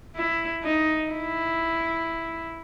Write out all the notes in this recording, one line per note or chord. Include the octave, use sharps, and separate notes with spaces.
E4
D#4
E4